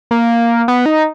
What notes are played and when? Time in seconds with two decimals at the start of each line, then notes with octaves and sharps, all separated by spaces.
0.11 A#3
0.68 B3
0.86 D#4